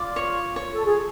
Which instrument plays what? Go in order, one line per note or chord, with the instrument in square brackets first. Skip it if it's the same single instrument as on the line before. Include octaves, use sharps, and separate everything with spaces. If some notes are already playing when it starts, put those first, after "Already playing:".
Already playing: [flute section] F4 [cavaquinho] D5
[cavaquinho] C#5
C#5
[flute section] A4
G#4